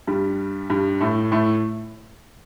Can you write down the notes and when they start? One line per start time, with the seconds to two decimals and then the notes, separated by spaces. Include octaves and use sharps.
0.07 G2 G3
0.70 G2 G3
1.00 A2 A3
1.31 A2 A3